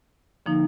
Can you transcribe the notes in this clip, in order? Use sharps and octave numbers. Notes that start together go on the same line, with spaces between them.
D3 F3 A#3 D#4